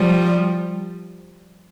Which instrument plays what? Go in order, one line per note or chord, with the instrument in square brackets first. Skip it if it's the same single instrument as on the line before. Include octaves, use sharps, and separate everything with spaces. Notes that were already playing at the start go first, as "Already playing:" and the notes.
Already playing: [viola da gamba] F3 G3